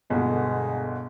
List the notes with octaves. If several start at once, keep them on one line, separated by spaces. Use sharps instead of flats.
G1 B2 D3 G#3